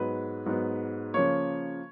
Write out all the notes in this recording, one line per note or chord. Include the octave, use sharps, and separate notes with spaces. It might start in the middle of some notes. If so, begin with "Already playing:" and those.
Already playing: G#2 F#3 B3 B4
G#2 F#3 B3
C#3 F3 A#3 C#5